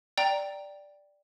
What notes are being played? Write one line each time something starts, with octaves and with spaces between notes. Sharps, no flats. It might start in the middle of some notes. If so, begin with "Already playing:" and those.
D5 G5 A#5